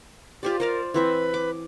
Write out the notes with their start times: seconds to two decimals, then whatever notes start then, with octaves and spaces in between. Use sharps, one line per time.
0.43 F4 G4 C5 D5
0.60 A#4 C5 D5 F5
0.94 E3 C4 B4 E5
1.34 D6